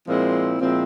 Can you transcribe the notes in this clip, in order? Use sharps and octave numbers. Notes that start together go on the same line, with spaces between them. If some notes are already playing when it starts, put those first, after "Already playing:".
A#2 F3 G#3 C4 E4
A#2 F3 G#3 C4 E4